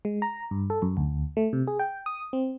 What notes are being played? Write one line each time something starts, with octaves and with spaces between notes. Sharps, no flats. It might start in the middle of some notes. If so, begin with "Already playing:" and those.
G#3
A#5
G2
A4
F#2
D2
A3
C3
G#4
G5
D#6
C4